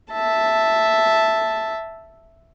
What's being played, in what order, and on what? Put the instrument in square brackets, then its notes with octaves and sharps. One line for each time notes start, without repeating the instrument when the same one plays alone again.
[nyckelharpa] E5 A5